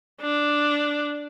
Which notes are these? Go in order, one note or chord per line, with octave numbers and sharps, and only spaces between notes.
D4